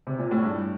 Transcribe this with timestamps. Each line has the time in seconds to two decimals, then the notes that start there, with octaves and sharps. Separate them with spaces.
0.07 C3
0.19 A#2
0.31 A2
0.43 G2